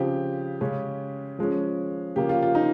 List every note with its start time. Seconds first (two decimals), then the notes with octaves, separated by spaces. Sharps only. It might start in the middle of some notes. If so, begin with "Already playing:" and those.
Already playing: C#3 F3 C4 G4
0.61 C#3 G#3 C#4
1.39 F3 G#3 C#4
2.16 C#3 F3 A#3 C#4 G4
2.29 F4
2.42 F4
2.55 D#4